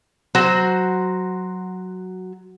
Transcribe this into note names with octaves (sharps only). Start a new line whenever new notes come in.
F#3 F#4 C5